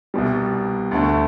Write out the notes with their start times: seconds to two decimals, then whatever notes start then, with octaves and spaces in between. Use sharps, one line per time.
0.14 C2 B2 G3
0.91 D2 D3 A3